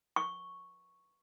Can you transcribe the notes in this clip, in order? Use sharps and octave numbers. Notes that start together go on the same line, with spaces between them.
C#6